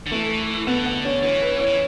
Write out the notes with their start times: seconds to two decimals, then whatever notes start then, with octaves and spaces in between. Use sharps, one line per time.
0.07 D3
0.11 E3 A3
0.67 D3 B3
0.86 B3
1.05 C#4
1.23 E3 C#4
1.42 B4
1.61 C#5
1.67 E3